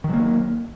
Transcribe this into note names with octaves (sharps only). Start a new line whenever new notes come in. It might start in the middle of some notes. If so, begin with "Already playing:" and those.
D#3 F#3 A#3